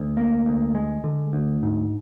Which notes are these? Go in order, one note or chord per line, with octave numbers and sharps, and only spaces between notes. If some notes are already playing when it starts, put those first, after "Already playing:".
Already playing: D2
A#3
D2
G#3
D3
D2
G#2